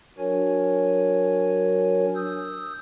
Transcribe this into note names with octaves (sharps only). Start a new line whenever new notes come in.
F#3 D4 F#4 A#4 C#5 G#5
D#6 E6 G6